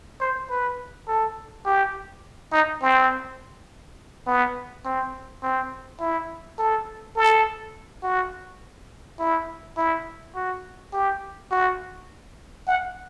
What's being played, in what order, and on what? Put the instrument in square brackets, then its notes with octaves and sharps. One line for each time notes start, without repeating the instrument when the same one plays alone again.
[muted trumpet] C5
B4
A4
G4
D#4
C4
B3
C4
C4
E4
A4
A4
F#4
E4
E4
F#4
G4
F#4
F#5